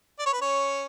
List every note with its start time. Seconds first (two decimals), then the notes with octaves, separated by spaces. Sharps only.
0.19 D5
0.26 C#5
0.33 B4
0.40 C#4 C#5